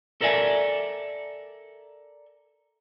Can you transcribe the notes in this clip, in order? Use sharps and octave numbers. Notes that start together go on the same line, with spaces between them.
A4 A#4 D5 E5 G#5